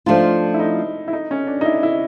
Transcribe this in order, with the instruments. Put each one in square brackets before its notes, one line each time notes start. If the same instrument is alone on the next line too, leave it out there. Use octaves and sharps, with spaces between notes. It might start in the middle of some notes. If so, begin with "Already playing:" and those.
[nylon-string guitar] F3 A3 D4 F4 [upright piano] D#4
[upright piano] E4
D#4
E4
D#4
C#4
D4
D#4
E4
E4